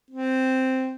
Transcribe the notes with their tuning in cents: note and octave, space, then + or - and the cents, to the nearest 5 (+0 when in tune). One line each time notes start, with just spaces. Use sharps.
C4 -5